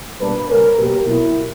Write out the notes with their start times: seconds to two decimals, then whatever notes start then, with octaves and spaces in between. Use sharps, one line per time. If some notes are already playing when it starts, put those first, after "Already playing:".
0.21 B2 G3 A#3 D4 B4
0.49 C#3 G3 A#3 C#4 A#4
0.77 B2 F#3 A#3 G4
1.06 B2 F#3 A#3 E4